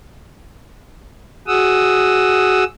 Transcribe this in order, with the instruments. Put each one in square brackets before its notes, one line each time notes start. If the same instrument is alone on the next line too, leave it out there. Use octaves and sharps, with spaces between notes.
[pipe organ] F#4 G#4 F#5 D#6 E6